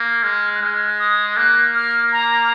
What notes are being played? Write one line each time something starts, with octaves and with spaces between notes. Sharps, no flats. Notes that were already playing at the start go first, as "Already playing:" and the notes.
Already playing: A#3
G#3 F6
F#6
G#3 F6
D#6
A#3 F#6
F6
A#5